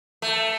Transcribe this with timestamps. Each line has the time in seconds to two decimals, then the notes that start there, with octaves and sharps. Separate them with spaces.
0.22 A3